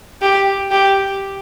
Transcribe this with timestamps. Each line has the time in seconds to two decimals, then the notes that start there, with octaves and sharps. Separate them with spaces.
0.21 G4
0.71 G4